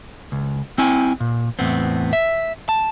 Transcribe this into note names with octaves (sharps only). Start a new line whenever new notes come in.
C#2
C4 E4 G#5
A#2
E2 A2 B3 C4
E5
A5